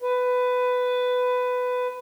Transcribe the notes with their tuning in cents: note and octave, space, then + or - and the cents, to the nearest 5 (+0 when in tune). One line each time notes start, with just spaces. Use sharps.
B4 +15